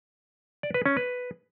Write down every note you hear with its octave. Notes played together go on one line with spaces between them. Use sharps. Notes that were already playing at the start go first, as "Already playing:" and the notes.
D5
B4
C#4
B4